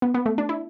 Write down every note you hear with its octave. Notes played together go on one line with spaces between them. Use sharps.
B3
B3
A3
D4
E4